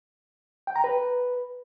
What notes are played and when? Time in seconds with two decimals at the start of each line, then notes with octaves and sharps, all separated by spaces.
0.67 G5
0.76 A#5
0.84 B4